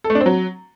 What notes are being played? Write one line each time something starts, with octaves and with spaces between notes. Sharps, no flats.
A4
A3
D4
C4
F#3